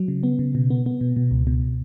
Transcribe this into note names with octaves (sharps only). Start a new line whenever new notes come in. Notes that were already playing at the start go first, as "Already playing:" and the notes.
Already playing: F#3
C#3
B3
C#3
B2
B3
B3
B2
B2
C#2
B2